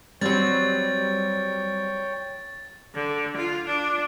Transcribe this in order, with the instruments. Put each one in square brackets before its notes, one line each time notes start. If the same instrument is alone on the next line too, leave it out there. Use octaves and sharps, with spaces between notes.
[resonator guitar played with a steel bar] F#3 C4 [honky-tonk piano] G3 [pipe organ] C#5 G5 [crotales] A6
[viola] D3
F4
D4